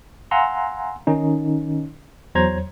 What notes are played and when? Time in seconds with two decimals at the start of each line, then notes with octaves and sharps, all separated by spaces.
0.31 F5 F#5 G#5 A#5 C6 E6
1.07 D#3 C#4 D#4
2.35 E2 F#3 C5 C#5 A#5 G#6